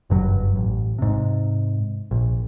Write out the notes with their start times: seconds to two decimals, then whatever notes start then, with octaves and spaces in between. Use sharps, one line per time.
0.10 F#1 G2 F#3
0.56 A1
0.99 G#2 C3
2.11 A#1